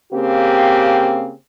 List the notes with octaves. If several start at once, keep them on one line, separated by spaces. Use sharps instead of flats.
C#3 A#3 C4 G4